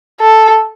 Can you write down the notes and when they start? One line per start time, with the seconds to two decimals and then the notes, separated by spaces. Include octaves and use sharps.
0.20 A4